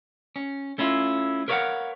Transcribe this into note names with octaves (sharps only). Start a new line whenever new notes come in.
C#4
A3 C#4 E4 F4
A#4 B4 C#5 D#5 F5 F#5